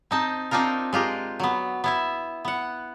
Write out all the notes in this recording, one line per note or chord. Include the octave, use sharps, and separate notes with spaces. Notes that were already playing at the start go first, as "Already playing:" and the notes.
C4 D#4 A5
C4 D4 D#4 F4 A#4
G#3 F4 G4 A#4
F#3 B3
B3 E4 E5
B3 F#5